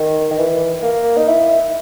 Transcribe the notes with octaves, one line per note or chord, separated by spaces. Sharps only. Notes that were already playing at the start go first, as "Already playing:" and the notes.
Already playing: D#3
D#3
E3
A#3
D#4
E4